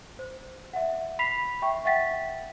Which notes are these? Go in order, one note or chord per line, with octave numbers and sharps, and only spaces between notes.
C5
E5 F#5
B5 B6 C7 F7
E5 G5 C#6
E5 F#5 G5 A6 B6